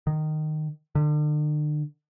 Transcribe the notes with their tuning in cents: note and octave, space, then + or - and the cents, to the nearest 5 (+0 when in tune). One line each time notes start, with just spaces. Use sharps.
D#3 -15
D3 +40